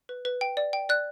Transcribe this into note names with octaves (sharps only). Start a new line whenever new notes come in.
B4
B4
G5
D5
G5
D5 F#6